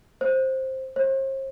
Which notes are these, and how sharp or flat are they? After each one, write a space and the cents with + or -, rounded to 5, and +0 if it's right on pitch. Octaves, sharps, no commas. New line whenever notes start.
C5 +10
C5 +40